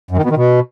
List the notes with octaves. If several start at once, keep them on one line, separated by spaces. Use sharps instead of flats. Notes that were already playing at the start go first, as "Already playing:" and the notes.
F#2
D#3
B2
D#3
B2